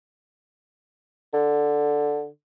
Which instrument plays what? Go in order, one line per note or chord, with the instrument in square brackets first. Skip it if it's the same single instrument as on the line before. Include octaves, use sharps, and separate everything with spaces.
[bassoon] D3